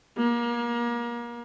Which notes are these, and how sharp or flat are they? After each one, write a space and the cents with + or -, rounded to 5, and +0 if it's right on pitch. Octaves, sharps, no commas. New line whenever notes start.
A#3 +30